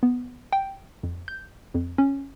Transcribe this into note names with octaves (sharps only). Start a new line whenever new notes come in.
B3
G5
F2
G6
F2
C#4